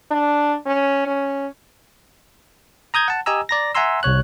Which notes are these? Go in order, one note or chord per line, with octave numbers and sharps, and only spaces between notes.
D4
C#4
C#4
A#5 D#6 G6 G#6
F#5 A5
G4 D#5 G#5 A#5 E6
D5 A#5 A#6
E5 F#5 G#5 A#5 C6 E6
C2 C3 C#5 F#6